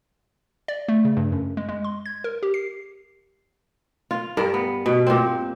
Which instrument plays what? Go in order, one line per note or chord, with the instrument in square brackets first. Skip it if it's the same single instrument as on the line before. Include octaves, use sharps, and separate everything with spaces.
[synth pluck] D5
A3
C#3
G2
F#2
G#3
G#3
C6
G#6
A#4
G4
C7
[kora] F4
G2 A#4
B3
B2
A#2 C4